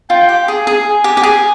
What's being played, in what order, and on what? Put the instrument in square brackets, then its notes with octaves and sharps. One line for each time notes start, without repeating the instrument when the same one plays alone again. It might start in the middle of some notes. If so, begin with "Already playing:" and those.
[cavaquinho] F4 [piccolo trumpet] G5
[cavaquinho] G4
[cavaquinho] G#4 [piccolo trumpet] G#5
[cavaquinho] G#4
G4
G4
G#4